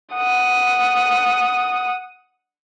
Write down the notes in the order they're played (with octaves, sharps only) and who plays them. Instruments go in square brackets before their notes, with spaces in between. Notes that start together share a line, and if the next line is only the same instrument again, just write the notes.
[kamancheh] F#5 D#6